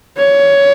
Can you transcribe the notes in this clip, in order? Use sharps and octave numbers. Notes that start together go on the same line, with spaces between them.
C#5